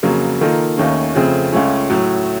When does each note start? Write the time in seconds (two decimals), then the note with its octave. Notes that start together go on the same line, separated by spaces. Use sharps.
0.03 F2 C#3 F#3 A#3 F4
0.41 D#3 A#3 F4 A4
0.78 D#2 D#3 A3 C#4
1.15 F2 C#3 A3 C4
1.53 C#2 C#3 A3 C#4
1.90 A2 F#3 A3